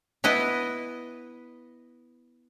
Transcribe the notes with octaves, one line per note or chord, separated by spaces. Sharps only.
B3 E4 D#5